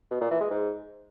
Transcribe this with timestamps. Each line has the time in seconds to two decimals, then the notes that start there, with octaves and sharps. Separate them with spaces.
0.11 B2
0.21 A#2
0.31 E3
0.41 G#3
0.50 G#2